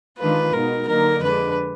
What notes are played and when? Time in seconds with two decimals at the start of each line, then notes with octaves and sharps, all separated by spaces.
0.19 D#3 G#3 D4 F4 B4
0.53 B2 G#3 D#4 A#4
0.87 D3 F#3 A#3 D#4 A#4
1.22 F2 D3 G#3 D4 B4